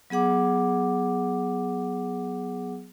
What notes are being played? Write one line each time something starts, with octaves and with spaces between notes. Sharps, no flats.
F#3 B3 G#4 F#5 D6